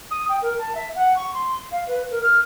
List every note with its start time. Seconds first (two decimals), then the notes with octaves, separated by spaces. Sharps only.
0.10 D#6
0.28 G5
0.41 A#4
0.58 A5
0.74 E5
0.95 F#5
1.16 C#6
1.33 C6
1.71 F5
1.87 B4
2.10 A#4
2.22 F6